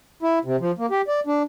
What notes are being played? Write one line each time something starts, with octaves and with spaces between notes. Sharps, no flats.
E4
C3
F3
A#3
G4
D5
D4